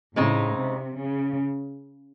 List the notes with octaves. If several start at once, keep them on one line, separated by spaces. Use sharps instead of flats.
A2 C#3 G#3 C4 D#4
C3
C#3